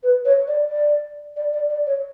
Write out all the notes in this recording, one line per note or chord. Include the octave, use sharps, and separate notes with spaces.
B4
C#5
D5
D5
D5
D5
D5
C#5